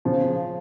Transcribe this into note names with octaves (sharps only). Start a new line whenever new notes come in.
C#3 F3